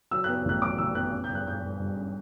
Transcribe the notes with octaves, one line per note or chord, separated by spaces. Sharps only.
F#3 E6
F#6
B3
A1 F#6
F#3 D6
A1 E6
B3 F#6
C#4
G6
G2
F#6
G2 G6
G2
G2
C#4